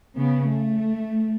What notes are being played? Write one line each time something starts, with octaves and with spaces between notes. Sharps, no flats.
C#3 B3
A3